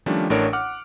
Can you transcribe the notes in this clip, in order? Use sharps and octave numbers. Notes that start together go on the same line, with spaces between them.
D#3 F3 G3 A3 C#4 D4
A1 A2 D4 A#4 C#5 D7
F#5 D6 F6 F#6